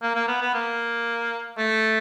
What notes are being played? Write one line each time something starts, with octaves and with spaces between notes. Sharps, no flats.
A#3
A#3
B3
B3
A#3
A3